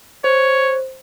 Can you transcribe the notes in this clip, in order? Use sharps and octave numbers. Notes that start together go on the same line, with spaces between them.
C5 C#5